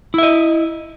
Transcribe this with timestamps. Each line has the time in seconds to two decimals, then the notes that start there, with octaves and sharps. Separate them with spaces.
0.14 E4
0.18 E5
0.23 D#5